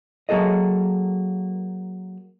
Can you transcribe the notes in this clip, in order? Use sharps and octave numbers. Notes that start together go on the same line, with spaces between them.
F#3 A#3 G#4 A4 D#5